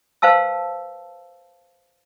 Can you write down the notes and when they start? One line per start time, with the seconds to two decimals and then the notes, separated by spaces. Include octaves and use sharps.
0.22 B4 C5 F5 A5 E6